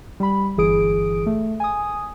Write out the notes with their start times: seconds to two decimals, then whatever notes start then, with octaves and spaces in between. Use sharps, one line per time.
0.20 G3 B5
0.57 G1 E3 G#4 D#6 D7
1.26 A3
1.60 G#5 D#6